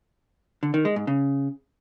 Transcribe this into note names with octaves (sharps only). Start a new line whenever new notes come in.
D3
D#3
G#3
G#2
C#3